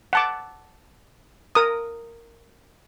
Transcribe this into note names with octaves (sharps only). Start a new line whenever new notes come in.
F#5 A5 D6
A#4 D#6